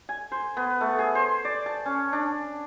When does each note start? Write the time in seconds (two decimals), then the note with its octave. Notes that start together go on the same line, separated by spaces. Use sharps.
0.09 G#5
0.32 C5
0.57 B3
0.81 A3
0.99 G#4
1.15 C5
1.45 D5
1.66 A5
1.86 C#4
2.13 D4